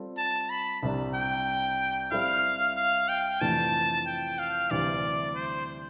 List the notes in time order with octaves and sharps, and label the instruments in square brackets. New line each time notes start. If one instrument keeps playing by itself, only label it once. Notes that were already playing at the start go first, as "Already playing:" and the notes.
Already playing: [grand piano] G3 C4 F4 A4
[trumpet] A5
B5
[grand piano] C2 C3 G3 D4
[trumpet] G5
[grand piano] G3 C4 E4 A4 [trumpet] F5
[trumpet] F5
G5
[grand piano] F2 C3 E3 A3 D4 [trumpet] A5
[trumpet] G5
F5
[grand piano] D2 C3 E3 G3 [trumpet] D5
[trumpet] C5